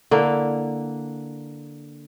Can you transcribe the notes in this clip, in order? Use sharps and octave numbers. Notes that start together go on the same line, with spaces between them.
D3 A#3 E4